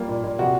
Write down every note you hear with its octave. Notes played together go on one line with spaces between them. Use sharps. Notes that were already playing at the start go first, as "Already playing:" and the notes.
Already playing: G3 A#3 F4
A#2
A#2
C3 F#4